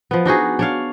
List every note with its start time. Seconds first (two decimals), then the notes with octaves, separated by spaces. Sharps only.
0.11 F3 B3
0.26 D4 D#4 F#4 G#4
0.59 D4 C#5 F5